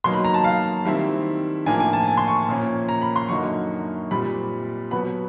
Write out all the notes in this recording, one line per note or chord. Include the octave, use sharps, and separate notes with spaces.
B2 F#3 A#3 D#4 C6
B5
A#5
A5
F5
D#3 G3 C4 E4
A2 F3 A#3 D4 G#5
G#5
A5
G#5
C6
C#6
A#2 F3 A#3 C#4
A#5
B5
C6
F#2 D3 F#3 A#3 D#4 C#6
A#2 G3 C4 B5
B2 F#3 B3 B5